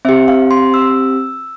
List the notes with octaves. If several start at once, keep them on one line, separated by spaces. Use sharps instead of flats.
C4 G4 E5
F5
C6
E6